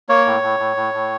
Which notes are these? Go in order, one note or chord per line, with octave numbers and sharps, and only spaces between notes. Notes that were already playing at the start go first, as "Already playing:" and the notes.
A#3 C#5
A2
A2
A2
A2
A2